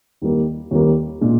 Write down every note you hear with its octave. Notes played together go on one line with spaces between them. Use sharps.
D#2 D#3 G3 A#3
D#2 D#3 G3 A#3
A#2 G#3 D4